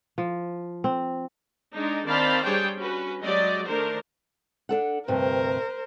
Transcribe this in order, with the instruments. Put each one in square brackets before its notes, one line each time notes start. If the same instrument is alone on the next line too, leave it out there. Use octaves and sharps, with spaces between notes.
[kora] F3
C4
[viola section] G#3 D4 D#4
D#3 C4 D5 F5 A5 B5
G3 D4 G#4 C5 C#5 G5
C#4 F#4 B4
F#3 G#3 G4 D5 D#5
D#3 A3 D4 A#4 C5
[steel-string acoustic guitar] D4 A4 F#5
[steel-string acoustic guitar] D2 G2 C3 [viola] A#4 C5